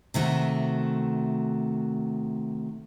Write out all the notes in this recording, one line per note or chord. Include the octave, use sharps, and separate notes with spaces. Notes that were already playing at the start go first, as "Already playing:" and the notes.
C3 D#3 A3 F#4